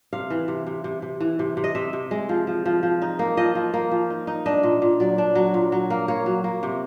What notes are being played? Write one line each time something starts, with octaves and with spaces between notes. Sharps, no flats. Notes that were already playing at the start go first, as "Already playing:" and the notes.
C3 F5
E3
C3
C3
C3
C3
E3
C3
C3
D#5
C3 E5
C3
G#3
F3
F3
F3
F3
D#4
A#3
F3 D#5
F3
A#3
F3
D#4
D#4
D4 D#5
A#2
A#2
F#3 D5
D4
F#3
A#2
F#3
A#3
A#3 C#5
F#3
A#3
C3